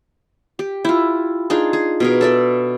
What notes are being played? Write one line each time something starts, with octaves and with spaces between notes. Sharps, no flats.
G4
E4 F4
D4 D#4 F4 G#4
G#4
B2 G#4 A#4
A4 D5 E5